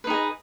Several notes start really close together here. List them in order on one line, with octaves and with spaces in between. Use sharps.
B4 D#4 G#4 D#5